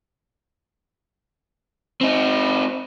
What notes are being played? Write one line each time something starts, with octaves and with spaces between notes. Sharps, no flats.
C4 D#4